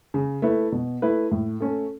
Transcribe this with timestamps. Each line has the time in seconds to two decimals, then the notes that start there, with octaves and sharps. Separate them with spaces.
0.14 C#3
0.42 A3 E4 B4
0.72 B2
1.02 A3 E4 B4
1.31 A2
1.60 A3 C#4 A4